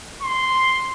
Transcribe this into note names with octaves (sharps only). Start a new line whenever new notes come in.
C6